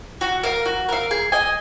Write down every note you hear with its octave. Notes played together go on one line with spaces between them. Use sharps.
F#4
A#4 F5
F#4
A#4 F5
G#4
D#5 G#5